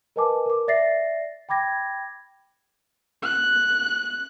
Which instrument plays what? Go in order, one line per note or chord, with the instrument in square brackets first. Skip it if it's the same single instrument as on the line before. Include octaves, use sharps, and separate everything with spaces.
[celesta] A#4 B4 D#5 G#5 A5 D6
A#4 D6
D5 E5 A6 A#6 C7
G5 B5 D6 G#6 A#6
[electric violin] F#6